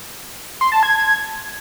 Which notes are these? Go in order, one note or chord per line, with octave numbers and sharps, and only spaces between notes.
C6
A5
G#6